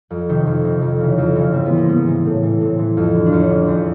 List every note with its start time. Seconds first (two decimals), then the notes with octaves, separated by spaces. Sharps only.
0.10 F2
0.29 C3 D#3
0.46 F2
0.64 C3 D#3
0.82 F2
1.00 C#3 E3
1.18 F2
1.36 C#3 E3
1.53 G#2 C4
1.66 B3
1.72 E3
1.77 A#3
1.89 G#2 B3
2.07 E3
2.25 A2
2.43 E3
2.61 A2 C4
2.79 E3
2.97 F2
3.15 D3
3.26 D4
3.32 F2 C#4
3.50 D3
3.68 E2